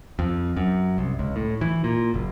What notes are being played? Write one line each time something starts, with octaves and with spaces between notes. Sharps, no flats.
F2
F#2
C2
C#2
A2
E3
A#2
F#1